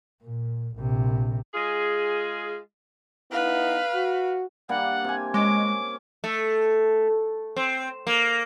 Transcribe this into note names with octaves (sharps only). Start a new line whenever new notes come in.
A#2
A#1 C3
G#3 F4 G#4
B3 D#4 E4 B4 F5
F#4
G3 A#3 D4 F#5
C3 G#5
G#3 C#4 D6
A3
C4
A#3